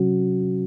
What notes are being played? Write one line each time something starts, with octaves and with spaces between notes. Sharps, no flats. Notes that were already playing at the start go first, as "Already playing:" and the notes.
Already playing: C3 F#3 C#4 F#4